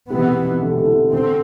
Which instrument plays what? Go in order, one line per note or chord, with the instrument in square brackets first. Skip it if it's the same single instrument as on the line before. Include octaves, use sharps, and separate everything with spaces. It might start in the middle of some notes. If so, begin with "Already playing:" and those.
[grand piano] C3 [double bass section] E3 B3
[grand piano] B2
C3
D3
C3
D3
E3
[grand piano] D3 [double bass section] C4